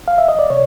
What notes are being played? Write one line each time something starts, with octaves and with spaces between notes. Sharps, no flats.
F5
E5
D#5
D5
C3 C#5